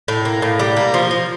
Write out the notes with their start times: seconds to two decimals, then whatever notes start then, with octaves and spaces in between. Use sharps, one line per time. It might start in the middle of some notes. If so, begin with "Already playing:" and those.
0.08 A2
0.25 A#3
0.42 A2
0.59 G3
0.76 A#3
0.94 F3
1.11 F3